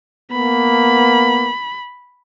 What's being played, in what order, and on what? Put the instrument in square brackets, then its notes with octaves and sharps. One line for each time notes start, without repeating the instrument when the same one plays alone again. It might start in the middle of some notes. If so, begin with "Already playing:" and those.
[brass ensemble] A#3 B3 [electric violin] B5